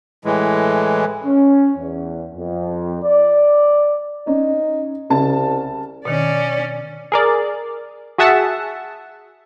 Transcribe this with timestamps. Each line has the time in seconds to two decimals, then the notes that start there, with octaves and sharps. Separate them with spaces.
0.25 A2 E3 G#3
1.24 C#4
1.77 E2
2.34 F2
3.03 D5
4.27 C#4 D#4
5.10 C2 C#3 A5
6.05 B2 D#3 C#4 D5
7.12 G#4 A#4 D5
8.18 F#4 G#4 E5 F#5 A5